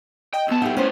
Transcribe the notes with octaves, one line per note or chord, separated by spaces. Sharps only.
D#5 G5
B1 B3 A5 E6
F#3 D#4 E4 G4 F#5
A2 B3 C#4 C5